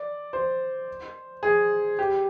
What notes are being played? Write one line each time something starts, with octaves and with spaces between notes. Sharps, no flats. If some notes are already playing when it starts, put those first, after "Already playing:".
Already playing: D5
C5
G#4
G4